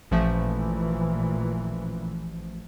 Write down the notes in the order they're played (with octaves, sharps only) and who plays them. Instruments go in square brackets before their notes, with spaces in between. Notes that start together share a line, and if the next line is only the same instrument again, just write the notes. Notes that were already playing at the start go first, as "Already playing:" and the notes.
[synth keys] A1 F3 A3 [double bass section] A#2 E3